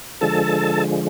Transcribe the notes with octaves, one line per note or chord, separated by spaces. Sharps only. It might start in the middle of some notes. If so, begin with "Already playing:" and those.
D3 F3 G#3 A4 A5